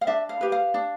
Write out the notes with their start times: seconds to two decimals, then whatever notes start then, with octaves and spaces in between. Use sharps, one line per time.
0.01 F5
0.07 D4 E5
0.29 F5
0.41 G4 B4
0.52 F5
0.74 D4